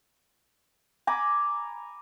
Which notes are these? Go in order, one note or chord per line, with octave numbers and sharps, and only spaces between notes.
G#5 A#5 B5 D6